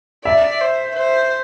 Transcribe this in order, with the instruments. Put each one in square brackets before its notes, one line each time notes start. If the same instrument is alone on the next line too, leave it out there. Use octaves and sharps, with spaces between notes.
[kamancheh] D5 [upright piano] E5
[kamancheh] C5
C5